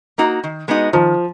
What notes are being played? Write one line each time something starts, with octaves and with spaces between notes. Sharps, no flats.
A#3 D#4 F#4
D#3
G#3 B3 D#4 F#4
D#3 F3